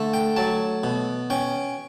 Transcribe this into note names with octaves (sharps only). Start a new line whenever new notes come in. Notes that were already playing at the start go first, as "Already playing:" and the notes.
Already playing: D3 A3
G5
F#3 A5
B2
C#4 G5